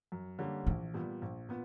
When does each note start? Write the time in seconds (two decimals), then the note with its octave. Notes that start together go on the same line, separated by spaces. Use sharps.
0.12 F#2
0.39 D3 G3 A#3 C#4
0.67 A#1 E3
0.94 A#2 G3 B3
1.22 A#1
1.49 A#2 B3